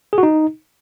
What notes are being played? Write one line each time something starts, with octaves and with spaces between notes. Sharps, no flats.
G#4
F#4
D#4